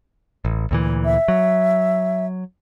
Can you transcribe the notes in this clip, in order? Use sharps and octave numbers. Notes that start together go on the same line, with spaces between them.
A1
D2 A#2 E3
E5
F#3